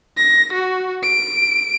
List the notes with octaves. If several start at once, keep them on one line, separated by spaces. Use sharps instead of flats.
A#6
F#4
D7